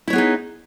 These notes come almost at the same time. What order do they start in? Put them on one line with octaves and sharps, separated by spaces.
E4 C#5 B3 G#4 D#4